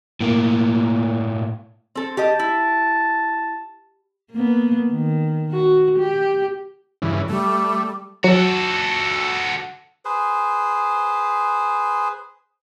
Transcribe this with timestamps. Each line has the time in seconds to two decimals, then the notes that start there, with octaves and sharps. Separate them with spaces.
0.20 A2 A#3
1.95 C4 A4
2.17 G4 D#5 A5
2.39 E4
4.32 A#3 B3
4.91 D#3
5.52 F#4
5.98 G4
7.02 G2 C#3 E3
7.29 G3 A3
8.24 F#3 F#4 A4
10.05 G#4 B4 C5